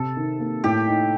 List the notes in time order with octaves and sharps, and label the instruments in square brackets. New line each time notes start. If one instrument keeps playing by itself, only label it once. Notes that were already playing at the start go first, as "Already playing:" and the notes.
Already playing: [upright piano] C3 [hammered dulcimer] A4
[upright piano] D#3
A#3
[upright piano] A2 [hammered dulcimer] G4
[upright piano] D#4